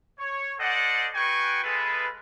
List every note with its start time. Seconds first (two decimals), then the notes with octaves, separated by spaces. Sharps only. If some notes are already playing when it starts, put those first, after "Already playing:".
0.19 C#5
0.59 A4 C5 D5 D#5 F#5
1.15 F#4 G#4 B4 G5 G#5 C#6
1.63 G#3 F4 G#4 A4 B4